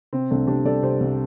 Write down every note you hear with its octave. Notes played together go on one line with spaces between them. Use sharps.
C3 C4
C2 A3 D4
C2 D4 G4
G3 A4 D5
C3 G4 C5
C2